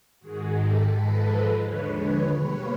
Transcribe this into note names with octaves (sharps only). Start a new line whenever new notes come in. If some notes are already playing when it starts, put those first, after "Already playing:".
G#2 D#3 G#3 F#4 G#4
G4 A4
G#2 F3 G#3 A4 B4
D#2 D3 F3 G#3 B4 C#5
B4 C#5
B2 G3 A#3 B4 C#5